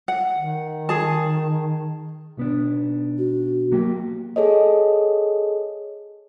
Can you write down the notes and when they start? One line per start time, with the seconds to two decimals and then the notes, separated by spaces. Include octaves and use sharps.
0.08 F#5
0.36 D#3
0.89 G#4 A5
2.37 B1 B3 D4
3.18 F#4
3.72 F#3 A#3 G4
4.36 G#4 A4 C#5 D#5